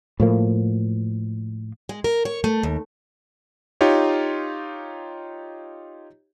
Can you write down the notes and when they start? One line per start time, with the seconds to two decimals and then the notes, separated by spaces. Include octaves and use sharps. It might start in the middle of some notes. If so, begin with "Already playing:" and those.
0.20 A2 F3 A#3
1.89 G#3
2.04 A#4
2.25 C#5
2.44 A3
2.63 D#2
3.81 D#4 F4 G4 C#5